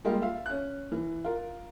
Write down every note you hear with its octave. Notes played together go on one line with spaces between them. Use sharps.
G3 G#3 A#3 F4 G4
F4 E5 F5
C#4 F#6
E3
F4 A#4